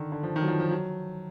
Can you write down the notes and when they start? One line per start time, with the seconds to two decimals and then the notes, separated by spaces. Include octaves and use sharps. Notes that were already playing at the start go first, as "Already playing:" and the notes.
Already playing: D3 D#3
0.12 D3
0.23 F3
0.36 D#3
0.42 F#3
0.48 F3
0.60 F3
0.71 F#3